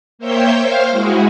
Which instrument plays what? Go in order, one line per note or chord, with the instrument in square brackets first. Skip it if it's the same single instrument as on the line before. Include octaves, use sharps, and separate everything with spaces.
[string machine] A#3 C5 C#5 E5 G5 G6
C5 F5 F6
G#3 E4 F#4 G#4